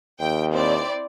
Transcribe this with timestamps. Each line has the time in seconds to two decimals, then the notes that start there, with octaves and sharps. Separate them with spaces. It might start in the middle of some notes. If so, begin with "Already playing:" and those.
0.20 D#2 G5
0.51 C4 E4 D5